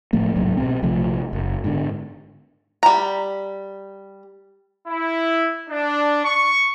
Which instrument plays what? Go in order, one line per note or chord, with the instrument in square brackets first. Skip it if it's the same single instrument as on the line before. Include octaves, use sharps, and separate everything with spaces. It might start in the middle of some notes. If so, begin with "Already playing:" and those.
[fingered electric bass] A2 F3 A3 A#3
D#1 C2 G#2 F#3
B2 C4
A#1 C3 F3 A3
F#1
G#2 D3
[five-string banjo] G3 A#5
[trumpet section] E4
D4
C#6